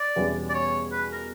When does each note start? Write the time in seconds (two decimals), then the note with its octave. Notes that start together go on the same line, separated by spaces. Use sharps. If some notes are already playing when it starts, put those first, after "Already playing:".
Already playing: D5
0.16 E2 B2 G3 C#4
0.50 D5
0.54 C#5
0.92 B4
1.12 A#4